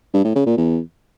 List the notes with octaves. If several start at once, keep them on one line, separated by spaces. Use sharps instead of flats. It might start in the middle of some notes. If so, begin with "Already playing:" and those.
G2
A2
C#3
A#2
E2